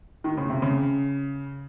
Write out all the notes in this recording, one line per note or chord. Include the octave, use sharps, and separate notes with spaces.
D#3
C#3
C3
C#3